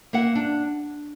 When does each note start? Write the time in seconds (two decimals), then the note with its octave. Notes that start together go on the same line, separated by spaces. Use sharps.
0.13 A#3 E5 F#5
0.35 D4